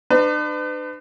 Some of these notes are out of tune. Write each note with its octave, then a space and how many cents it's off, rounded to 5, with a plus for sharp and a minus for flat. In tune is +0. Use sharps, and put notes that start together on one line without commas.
D4 +40 B4 +40